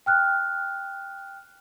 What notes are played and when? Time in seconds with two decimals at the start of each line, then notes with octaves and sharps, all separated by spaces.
0.06 G5 F6 F#6